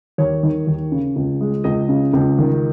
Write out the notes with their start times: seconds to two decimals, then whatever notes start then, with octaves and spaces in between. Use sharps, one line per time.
0.18 D#2 C#5
0.43 D#3
0.67 D#2
0.92 C#3
1.16 C#2
1.41 G#3
1.64 C#2 D#5
1.89 C#3
2.13 C#2
2.38 D#3